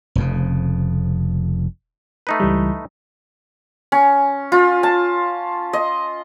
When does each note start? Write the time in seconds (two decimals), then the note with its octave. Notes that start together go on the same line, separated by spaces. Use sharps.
0.15 F1 F2 C#3
2.27 A3 D#4 B4
2.40 C#2 E3 G3
3.92 C#4
4.52 F4
4.83 A5
5.73 D#5